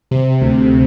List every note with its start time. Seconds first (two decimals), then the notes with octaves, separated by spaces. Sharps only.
0.11 C3
0.41 D2